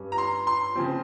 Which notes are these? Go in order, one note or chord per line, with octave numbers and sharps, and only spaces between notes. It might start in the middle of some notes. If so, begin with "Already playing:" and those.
Already playing: G2 G3 C#4
A#5
C6
C6
C#3 F3 C4